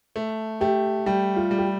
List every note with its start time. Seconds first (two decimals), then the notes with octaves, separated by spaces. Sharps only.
0.16 A3
0.61 A3 G4
1.06 G3 G4
1.36 F4
1.51 G3
1.58 G4